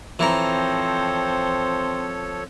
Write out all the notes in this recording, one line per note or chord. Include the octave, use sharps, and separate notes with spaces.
E3 F3 C4 A4 C#5 A#5